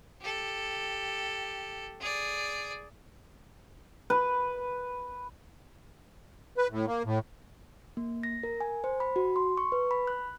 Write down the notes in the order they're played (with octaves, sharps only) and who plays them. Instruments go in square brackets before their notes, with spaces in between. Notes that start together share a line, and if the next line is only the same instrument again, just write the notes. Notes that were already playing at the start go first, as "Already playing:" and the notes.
[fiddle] G4 A4
G#4 D5
[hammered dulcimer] B4
[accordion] B4
A2
A#3
A2
[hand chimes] A#3
A#6
A#4
G#5
C5
B5
F#4
C6
C#6
B4
B5
F#6